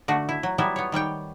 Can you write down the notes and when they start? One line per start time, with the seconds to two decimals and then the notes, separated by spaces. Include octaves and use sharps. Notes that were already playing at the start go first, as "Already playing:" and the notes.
0.08 D3 A3 F#4
0.29 E4
0.43 F#3
0.58 F#3 G3 B3 E4
0.76 B3 C#5
0.92 D#3 G3 C#5 G5